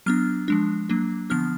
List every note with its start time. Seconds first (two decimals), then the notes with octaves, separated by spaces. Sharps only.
0.06 F#3 B3 D4 F6
0.48 F3 G#3 D4
0.89 F#3 A#3 D4
1.30 D3 F3 B3 D4 F6